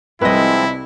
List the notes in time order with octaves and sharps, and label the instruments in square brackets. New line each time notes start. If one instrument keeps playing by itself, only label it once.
[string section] C2 [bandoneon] F3 G#3 C4 [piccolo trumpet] E4 [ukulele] B4 D#5